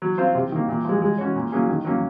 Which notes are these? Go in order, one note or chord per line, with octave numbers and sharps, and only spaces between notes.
F#3
C4 F4 C5
C3
D#3 A#3
A#2
F3 G#3
G#3
C#4 F#4 C#5
A#2
F#3 A#3 C#4 G#4
D#3
F#3 A#3 C#4